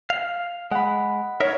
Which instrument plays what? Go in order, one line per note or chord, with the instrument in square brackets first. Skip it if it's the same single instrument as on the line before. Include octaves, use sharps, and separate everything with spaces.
[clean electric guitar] F5
[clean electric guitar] G#3 [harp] F#5 B5
[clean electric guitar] D#4 A#4 E5 [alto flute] C#5